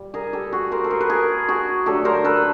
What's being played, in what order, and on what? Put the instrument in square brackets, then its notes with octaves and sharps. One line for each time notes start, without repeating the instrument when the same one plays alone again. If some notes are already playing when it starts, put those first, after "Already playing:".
Already playing: [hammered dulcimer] A#2 G3
G#4 A#4
G4 A4
F#4 G#4
A#4 C5
A4
G#4 A#4
B4
G#4 A#4
F#4 G#4
D3 F#3 A3 G4 A4
A#4 C5
A4 B4